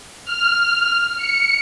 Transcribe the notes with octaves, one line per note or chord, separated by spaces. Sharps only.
F6
C#7